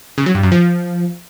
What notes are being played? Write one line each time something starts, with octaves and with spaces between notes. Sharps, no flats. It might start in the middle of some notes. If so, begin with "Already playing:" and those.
C#3
F#3
G2
F#2
F3